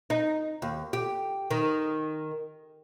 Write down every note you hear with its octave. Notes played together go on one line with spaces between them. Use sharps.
D#4
D#2
G4
D#3